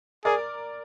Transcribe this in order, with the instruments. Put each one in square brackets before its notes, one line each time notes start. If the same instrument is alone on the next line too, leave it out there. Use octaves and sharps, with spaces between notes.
[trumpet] G#4 [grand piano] A#4 D5